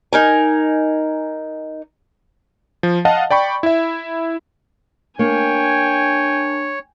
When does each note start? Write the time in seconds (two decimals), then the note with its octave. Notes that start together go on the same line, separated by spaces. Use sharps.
0.13 D#4 A#4 G#5
2.83 F3
3.05 D#5 F5 F#5 A5
3.30 D5 G5 B5 C#6
3.63 E4 E5
5.19 A#3 D4 C#5 G5 G#5